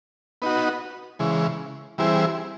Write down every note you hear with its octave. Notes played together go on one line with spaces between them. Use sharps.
B3 D#4 F#4
C#3 E3 G#3
E3 G3 C4 E4 G#4